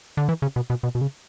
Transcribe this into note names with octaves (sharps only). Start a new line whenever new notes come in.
D3
E3
C#3
B2
B2
B2
B2
C#3